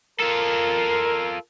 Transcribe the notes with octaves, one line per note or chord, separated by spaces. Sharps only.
F4 A4 A#4